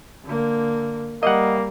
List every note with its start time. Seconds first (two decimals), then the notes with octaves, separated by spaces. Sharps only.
0.24 D3 A#3
1.23 G3 A#3 D#5 F#5